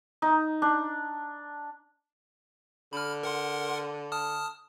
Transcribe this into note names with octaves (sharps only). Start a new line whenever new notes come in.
D#4
D4
D3 B5 F6
A#4 F#5 C6
A5 D#6 F6